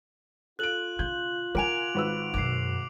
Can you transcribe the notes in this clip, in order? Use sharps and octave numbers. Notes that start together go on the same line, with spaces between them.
F4 A4 F#6 D7 F#7
C#3 G6
C#3 A#4 F#5 G#5 D6 D7 F7
G#1 B4 E6
F#2 B2 D6 C7